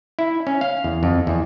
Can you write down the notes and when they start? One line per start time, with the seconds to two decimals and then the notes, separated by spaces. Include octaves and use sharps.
0.19 E4
0.47 C#4
0.61 F5
0.84 E2
1.03 F2
1.27 E2